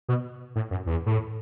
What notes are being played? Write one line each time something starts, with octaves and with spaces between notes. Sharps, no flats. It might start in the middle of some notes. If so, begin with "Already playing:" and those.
B2
A2
F#2
E2
A2